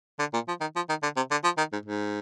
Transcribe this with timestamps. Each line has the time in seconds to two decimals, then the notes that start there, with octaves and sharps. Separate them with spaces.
0.19 D3
0.34 A#2
0.48 F3
0.61 D#3
0.76 F3
0.89 D#3
1.03 D3
1.16 C3
1.31 D3
1.44 F3
1.58 D#3
1.72 G#2
1.86 G#2